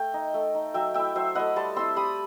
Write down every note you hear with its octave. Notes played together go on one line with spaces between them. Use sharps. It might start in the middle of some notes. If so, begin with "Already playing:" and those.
Already playing: A3 G5
D#4
A3
D#4
F#3 E5 G5
A3 E4 E5 G5
F#3 C5 E5
A3 E4 D#5 F#5
G3 A5 C6
C4 E4 C6 E6
G3 B5 D#6